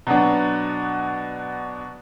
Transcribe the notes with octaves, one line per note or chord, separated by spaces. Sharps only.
B2 F#3 B3 D4